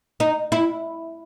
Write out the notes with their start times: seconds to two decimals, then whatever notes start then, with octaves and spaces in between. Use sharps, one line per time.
0.20 D#4
0.52 E4